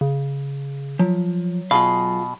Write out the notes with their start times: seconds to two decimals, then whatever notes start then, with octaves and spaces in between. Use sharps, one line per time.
0.01 C#3
0.99 F3 F#3
1.71 B2 F4 G#4 F5